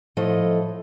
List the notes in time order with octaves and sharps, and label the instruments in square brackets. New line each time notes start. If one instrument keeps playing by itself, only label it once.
[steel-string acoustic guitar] A2 F3 A3 D#5